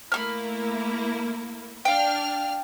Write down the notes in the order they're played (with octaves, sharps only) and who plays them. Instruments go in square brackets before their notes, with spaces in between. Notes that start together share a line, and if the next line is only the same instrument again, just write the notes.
[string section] A3 A#3 E4 [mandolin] B5 C#6 F6
[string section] D4 F6 [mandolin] F5 G5